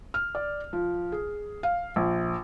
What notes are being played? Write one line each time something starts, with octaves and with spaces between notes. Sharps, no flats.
F6
D5
F3
G#4
F5
A#1